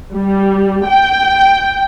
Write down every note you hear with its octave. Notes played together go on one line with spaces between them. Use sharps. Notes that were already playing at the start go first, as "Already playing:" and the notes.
G3
G5